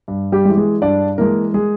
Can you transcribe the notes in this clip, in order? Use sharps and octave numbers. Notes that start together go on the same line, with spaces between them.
G2
G3 G4
G#3
E3
G#3 G#4
G2 D4 D5
E3 G#3 A#3 A#4
G#3 G#4